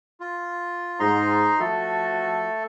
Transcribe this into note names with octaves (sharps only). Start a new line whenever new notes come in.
F4
G#2 D#4 A#5 C6
F3 A3 F#4 A4 A5